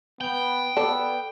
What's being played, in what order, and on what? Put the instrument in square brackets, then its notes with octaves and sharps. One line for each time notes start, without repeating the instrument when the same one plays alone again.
[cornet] B3 [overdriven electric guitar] G5
[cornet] B3 [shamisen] A4 [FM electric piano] D5